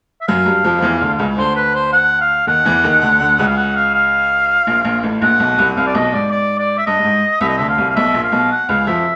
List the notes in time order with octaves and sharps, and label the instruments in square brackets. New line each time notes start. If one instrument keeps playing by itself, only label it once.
[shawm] E5
[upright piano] F#2 F#3 [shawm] F5
[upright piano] G2 G3
F2 F3
F3
E2 E3
D2 D3
C#2 C#3
[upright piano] D2 D3 [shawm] C5
[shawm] B4
C5
F#5
F5
[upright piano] D#2 D#3 [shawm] F#5
[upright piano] E2 E3
D#2 D#3
D2 D3
D2 D3
C#2 C#3
[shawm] F5
F#5
F5
F5
[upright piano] A#1 A#2
A#1 A#2
A1 A2
[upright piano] A#1 A#2 [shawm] F#5
[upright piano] B1 B2
C2 C3
[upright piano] C2 C3 [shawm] F5
[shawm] D5
[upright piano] B1 B2 [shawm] D#5
[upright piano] G#2 [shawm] D5
[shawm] D5
D5
E5
[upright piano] G2 [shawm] D#5
[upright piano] G2
G#2
[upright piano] C2 C3 [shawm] E5
[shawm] D#5
[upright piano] D2 D3 [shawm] E5
[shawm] F5
[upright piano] C2 C3
[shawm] F5
[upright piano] B1 B2 [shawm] E5
[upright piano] A#1 A#2
[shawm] F5
[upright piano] B1 B2
[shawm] F#5
[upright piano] C#2 C#3 [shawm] F5
[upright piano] F2 F3 [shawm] E5